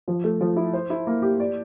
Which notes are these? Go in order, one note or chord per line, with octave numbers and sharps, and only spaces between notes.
F3
A3
F3
E4
C5
E4
A#3
G4
D5